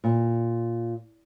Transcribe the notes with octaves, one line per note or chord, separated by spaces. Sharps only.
A#2